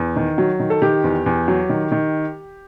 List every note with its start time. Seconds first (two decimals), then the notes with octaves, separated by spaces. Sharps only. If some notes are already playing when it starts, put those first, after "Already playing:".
Already playing: E2
0.16 D#3
0.38 F#3
0.60 D#3
0.70 A4
0.82 D#3 G4
1.04 E2
1.26 E2
1.48 F#3
1.69 D#3
1.92 D#3